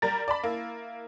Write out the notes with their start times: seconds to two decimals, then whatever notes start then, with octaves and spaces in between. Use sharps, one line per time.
0.02 G3 A#4 A#5 A6
0.28 D5 A5 B5
0.43 A#3 E4